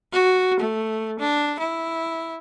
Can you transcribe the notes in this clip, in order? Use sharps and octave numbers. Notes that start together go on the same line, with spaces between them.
F#4
A3
D4
E4